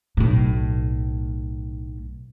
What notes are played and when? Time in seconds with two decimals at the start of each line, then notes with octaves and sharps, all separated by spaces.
0.17 B1 A2